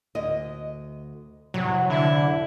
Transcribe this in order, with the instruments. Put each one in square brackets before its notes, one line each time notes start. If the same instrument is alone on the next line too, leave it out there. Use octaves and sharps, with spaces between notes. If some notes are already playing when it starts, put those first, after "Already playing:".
[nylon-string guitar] D2 D#5
[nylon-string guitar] F2 C3 E3 [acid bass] F#3
[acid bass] D3 [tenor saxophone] E4